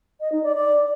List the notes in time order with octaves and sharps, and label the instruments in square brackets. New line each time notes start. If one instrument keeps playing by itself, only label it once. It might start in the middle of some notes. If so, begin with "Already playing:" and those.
[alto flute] D#5
D#4
D5
D5